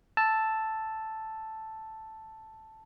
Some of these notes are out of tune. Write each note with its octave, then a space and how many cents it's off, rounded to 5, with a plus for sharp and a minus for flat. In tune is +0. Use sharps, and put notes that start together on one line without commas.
A5 +0 E6 +0